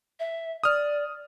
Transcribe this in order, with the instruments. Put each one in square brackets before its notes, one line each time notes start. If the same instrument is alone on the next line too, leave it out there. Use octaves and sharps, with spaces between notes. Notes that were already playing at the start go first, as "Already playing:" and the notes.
[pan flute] E5
[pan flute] D5 [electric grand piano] D#6 F6